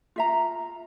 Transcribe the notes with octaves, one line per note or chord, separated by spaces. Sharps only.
F4 E5 A#5